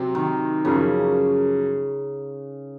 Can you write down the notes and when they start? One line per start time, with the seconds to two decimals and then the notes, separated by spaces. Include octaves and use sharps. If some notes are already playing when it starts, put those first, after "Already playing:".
Already playing: C3 F#3 C4
0.15 D#3
0.65 F#2 C#3 F3 A#3 C#4